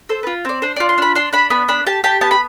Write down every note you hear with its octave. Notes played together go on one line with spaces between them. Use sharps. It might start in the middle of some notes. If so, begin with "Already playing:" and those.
A4 C5
F4 B4
C4 D5
D4 C5
F4 D5
C6
D4 B5
D4 C6
D4 B5
B3 B5
D4 B5
G4 A5
G4 A5
B3 A5
B5